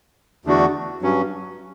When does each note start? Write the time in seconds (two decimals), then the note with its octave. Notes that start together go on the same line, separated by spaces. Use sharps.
0.45 E2 D3 A3 D4 F#4
1.02 G2 F#3 C#4